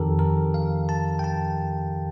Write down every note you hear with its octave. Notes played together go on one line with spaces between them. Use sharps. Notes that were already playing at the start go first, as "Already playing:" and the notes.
Already playing: F2 D#3 G4 A4 A#4
A#4
F5
A5
G5
A5